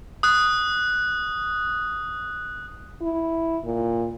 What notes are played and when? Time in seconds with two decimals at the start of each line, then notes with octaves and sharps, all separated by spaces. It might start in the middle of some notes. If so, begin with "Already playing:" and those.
0.23 D#6 F#6
3.02 E4
3.65 A#2